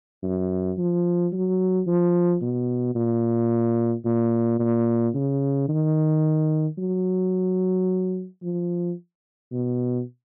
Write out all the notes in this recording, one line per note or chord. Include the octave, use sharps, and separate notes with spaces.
F#2
F3
F#3
F3
B2
A#2
A#2
A#2
C#3
D#3
F#3
F3
B2